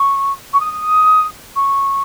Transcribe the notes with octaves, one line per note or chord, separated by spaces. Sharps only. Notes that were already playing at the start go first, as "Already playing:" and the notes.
Already playing: C#6
C#6
D#6
C#6